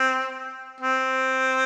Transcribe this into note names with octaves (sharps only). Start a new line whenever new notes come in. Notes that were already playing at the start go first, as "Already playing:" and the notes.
Already playing: C4
C4